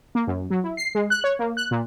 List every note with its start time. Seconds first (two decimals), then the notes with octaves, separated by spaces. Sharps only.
0.15 A#3
0.27 F#2
0.50 F#3
0.64 E4
0.77 C7
0.95 G#3
1.10 F#6
1.24 C#5
1.39 A#3
1.57 F#6
1.71 A#2